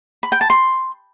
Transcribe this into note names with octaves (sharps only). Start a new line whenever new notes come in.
B5
G5
A5
C6